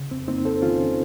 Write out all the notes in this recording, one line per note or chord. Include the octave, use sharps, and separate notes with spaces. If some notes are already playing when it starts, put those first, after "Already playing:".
Already playing: C#3
F2 C4
A#3 C4 D#4
F2 A4 C5
D#3 C#4 F4